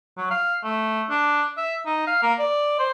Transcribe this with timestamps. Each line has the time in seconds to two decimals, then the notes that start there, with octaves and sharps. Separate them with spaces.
0.17 F#3
0.31 F5
0.63 A3
1.10 D4
1.57 E5
1.86 D#4
2.07 F5
2.23 A#3
2.39 D5
2.79 C5